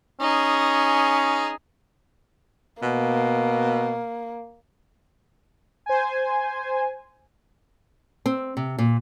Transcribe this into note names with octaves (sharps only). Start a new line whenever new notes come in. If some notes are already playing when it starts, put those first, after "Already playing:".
C#4 D#4 G#4
B2 A#3
C5 G#5
C4
C3
A#2